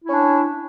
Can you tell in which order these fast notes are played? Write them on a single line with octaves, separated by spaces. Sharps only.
E4 C#4 D4